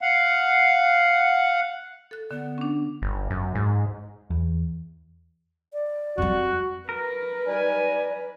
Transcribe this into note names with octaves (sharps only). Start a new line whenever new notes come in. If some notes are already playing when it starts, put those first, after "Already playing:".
F5 F#5
A4 F#6
D3 B3
C#4 D4
G1
F#2
G#2
E2
D5
F2 G3 F#4
A#4 B4
G3 D#4 D5 G#5